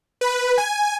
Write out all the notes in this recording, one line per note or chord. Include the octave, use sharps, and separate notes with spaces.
B4
G#5